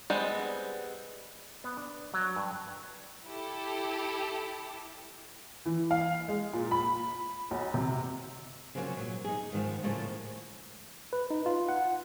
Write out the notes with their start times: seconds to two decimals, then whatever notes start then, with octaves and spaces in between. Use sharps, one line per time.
0.10 G3 G#3 B3 C4
1.64 B3
1.77 D4
2.14 F#3
2.36 G2
3.26 E4 G4 A4
5.65 E3
5.91 F5
6.28 G#3
6.53 A#2
6.71 B5
7.51 B1
7.74 C3
8.75 C#3 F3 F#3 A#3 C#4
8.97 A#2 F#3
9.24 D#4 G#4
9.52 G#2 D#3 F3
9.83 A2 C#3 F3 A3 A#3
11.13 B4
11.30 D#4
11.46 F4
11.69 F#5